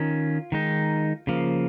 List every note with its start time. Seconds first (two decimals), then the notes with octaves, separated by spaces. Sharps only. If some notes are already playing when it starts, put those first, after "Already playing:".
Already playing: D#3 C#4 F4
0.52 D#3 G#3 D#4
1.27 C#3 F3 A#3